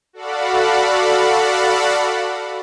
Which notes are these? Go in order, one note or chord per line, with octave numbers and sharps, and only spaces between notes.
F#4 A4 D5 F5 F#5 B5